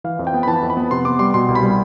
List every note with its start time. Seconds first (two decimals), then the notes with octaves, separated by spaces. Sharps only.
0.04 E3 F5
0.19 F2
0.27 G5
0.34 B3
0.43 B5
0.48 E3 A5
0.63 F2
0.70 B5
0.77 B3
0.91 C3 C6
1.05 B3 D6
1.19 G3 C6
1.34 B2 C6
1.48 C2
1.55 B5
1.63 G3